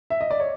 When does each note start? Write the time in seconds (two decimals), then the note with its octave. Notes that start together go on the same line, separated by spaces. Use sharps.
0.10 E5
0.21 D#5
0.31 D5
0.40 C#5